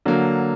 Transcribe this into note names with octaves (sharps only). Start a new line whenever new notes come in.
D3 F#3 A#3